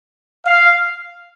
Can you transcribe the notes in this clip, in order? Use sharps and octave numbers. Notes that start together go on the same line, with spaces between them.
F5